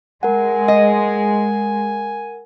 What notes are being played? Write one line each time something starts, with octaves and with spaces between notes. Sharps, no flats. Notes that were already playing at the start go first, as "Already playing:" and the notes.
G#3 A#4 F#5 G#5
D#5